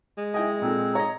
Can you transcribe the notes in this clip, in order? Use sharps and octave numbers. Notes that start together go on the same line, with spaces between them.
G#3
E4 D#5 G5 G#5
A#2 C4 A4
C#5 D#5 A#5